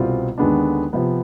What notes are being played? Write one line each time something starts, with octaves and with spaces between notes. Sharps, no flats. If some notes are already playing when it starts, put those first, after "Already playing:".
Already playing: C2 B2 G3 C4 F4
D#2 D3 G#3 B3 D4
C3 F3 B3